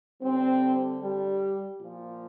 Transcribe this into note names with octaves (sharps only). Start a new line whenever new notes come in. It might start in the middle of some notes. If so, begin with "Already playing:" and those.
D3 G3 C4
G3
A#2 F3